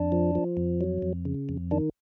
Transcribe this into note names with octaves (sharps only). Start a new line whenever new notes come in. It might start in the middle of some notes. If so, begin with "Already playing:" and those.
Already playing: F2 D4
F3
F3
F2
F#3
F2
C#3
F2
D#3 D4